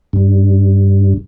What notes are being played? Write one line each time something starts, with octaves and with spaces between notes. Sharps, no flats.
G2